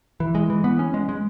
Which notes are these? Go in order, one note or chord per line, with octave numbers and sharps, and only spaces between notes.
E3
G#3
E3
B3
C#4
G#3
G#3